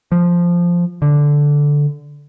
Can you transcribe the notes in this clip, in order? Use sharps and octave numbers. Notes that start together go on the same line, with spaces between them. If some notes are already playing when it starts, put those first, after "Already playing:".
F3
D3